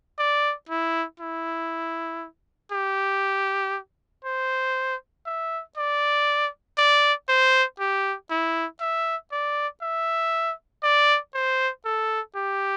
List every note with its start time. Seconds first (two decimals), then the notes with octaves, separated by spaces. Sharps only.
0.19 D5
0.69 E4
1.20 E4
2.72 G4
4.25 C5
5.26 E5
5.77 D5
6.78 D5
7.29 C5
7.79 G4
8.30 E4
8.81 E5
9.32 D5
9.82 E5
10.83 D5
11.34 C5
11.85 A4
12.36 G4